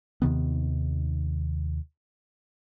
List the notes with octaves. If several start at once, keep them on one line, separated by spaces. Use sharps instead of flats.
D#2 C3 D#3 B3